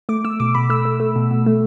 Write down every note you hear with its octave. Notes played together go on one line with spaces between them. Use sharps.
A3 D6
A3 E6
B2 D6
B2 B5
A3 E6
A3
A3
B2
B2
A3